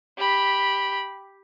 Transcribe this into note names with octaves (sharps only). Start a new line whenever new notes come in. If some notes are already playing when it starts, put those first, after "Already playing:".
G4 B5